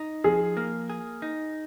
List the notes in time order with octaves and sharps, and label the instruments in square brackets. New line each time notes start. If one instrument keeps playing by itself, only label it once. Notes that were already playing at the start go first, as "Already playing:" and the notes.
Already playing: [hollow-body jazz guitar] D#4
[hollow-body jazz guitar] F3 [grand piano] G#4
[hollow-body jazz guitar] A#3
G#4
D#4